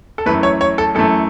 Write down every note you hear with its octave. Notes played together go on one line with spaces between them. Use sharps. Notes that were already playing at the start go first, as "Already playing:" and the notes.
A4
F#2 E3 A3 B4
C#5
C#5
A4
F#2 E3 A3 A4